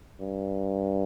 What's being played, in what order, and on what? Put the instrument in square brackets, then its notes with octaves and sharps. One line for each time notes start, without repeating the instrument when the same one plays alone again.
[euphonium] G2